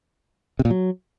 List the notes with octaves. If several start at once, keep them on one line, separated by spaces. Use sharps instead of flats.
C3
A#2
F#3